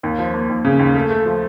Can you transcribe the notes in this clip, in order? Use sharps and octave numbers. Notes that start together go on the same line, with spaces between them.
D#2
F3
A#3
D#2
C#3
D#2
A3
A3
F3